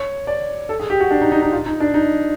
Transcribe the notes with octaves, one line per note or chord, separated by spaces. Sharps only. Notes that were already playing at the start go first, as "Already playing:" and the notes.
Already playing: C#5
D5
A4
G#4
G4
F#4
D4
D#4
D#4
D#4
F4
D#4
D4
D#4